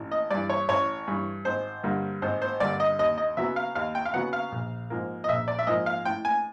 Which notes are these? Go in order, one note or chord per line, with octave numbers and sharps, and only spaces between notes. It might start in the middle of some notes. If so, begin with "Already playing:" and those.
Already playing: A1
D#5
G2 E3 D5
C#5
A1 C#5
G2 E3
G#1 C5
G2 D3 G3 A#3
G#1 C5
C5
G2 D3 G3 A#3 D5
D#5
D#2 D#5
D#5
C#3 F#3 B3 E5
F5
D#2 F5
G5
F5
C#3 F#3 B3 F#5
F5
A#1
G#2 F3 A#3
D#5
A#1 E5
D5
E5
G#2 F3 A#3 D#5
F5
A2 G5
G#5